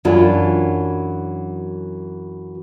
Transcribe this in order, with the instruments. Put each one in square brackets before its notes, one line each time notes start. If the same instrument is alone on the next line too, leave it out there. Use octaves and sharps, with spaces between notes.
[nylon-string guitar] F#2 E3 F#3 D4 F4 A5